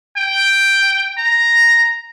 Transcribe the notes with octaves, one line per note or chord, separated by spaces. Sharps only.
G5
A#5